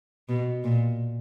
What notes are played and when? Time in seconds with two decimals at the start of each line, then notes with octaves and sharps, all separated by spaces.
0.29 B2
0.64 A#2